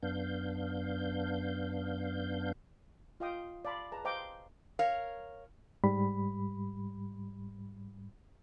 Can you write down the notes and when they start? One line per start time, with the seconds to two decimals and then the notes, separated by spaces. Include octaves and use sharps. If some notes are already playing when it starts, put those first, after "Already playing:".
0.03 F#2 B3 D4 F5 G6
3.20 F4 D#5 F5 G5 D#6
3.65 D5 F5 A5 B5 C6
3.92 G#4 B4 A5 A#5
4.05 C5 D#5 F5 G5 A#5 D6
4.79 A#4 C#5 F5
5.84 G#2 G3 B5